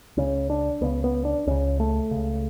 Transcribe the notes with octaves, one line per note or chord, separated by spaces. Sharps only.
C#2 C#3 C#4
D4
C#2 C#3 B3
B3
D4
C#2 C#3 C#4
A3
C#2 C#3